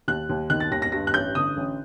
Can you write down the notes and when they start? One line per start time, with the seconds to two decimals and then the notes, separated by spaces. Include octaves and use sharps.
0.08 D#2 F#6
0.29 D#2
0.50 D#3 F#6
0.60 A6
0.71 D#2 A#6
0.82 A#6
0.92 G2 A#6
1.07 F#6
1.14 A1 G6
1.35 D3 D#6
1.57 A1